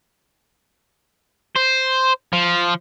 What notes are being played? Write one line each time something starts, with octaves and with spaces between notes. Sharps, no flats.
C5
F3